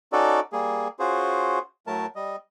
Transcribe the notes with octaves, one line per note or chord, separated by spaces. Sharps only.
C#4 D#4 F#4 A4 D5
G3 A#3 G#4
C#4 F4 F#4 G#4 C5
A2 F#3 A3 A#4 A5
G3 D#5